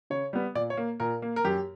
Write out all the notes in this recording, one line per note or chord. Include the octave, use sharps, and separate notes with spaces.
C#3 C#5
G3 B3
A#2 D5
C#5
A#3
A#2 A#4
A#3
A#4
F#2 G4